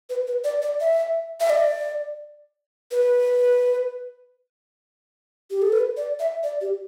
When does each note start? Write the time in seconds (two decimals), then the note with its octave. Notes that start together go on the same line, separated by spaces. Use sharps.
0.10 B4
0.27 B4
0.44 D5
0.62 D5
0.80 E5
1.40 E5
1.50 D5
2.91 B4
5.50 G4
5.62 A4
5.72 B4
5.97 D5
6.20 E5
6.43 D5
6.61 G4